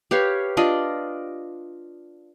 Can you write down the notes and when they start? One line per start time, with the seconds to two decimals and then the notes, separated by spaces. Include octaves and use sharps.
0.11 G4 B4 C#5 F5
0.57 D4 F4 D5 D#5